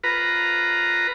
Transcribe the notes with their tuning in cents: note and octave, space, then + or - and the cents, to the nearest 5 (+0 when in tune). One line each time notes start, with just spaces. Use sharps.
F4 +0 B4 +0 A#5 +0